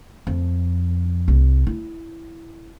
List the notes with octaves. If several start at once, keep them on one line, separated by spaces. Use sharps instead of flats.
F2
C2
E4